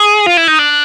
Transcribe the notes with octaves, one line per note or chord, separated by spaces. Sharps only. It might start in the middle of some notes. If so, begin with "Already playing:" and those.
Already playing: G#4
F4
E4
D#4
D4